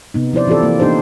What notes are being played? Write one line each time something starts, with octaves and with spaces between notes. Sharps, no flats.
C3 B3 D#4
F3 E4 C5 D5
E3 C4 F4 G4 A4 D5
A#3
A#3 B3 D4 D#4 G4 C5